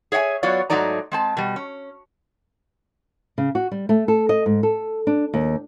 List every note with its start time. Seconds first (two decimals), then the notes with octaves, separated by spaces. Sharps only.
0.12 G#4 C#5 E5 F#5 G#5
0.43 F#3 B3 F4 C#5 D5
0.70 G#2 F#3 A3 D#4 D5 A#5
1.12 G#3 C4 A5
1.37 B2 G3
1.56 C#4
3.38 C#3
3.55 F#4
3.71 G3
3.89 A3
4.08 A4
4.29 D#5
4.46 G#2
4.63 A4
5.07 D4
5.34 D#2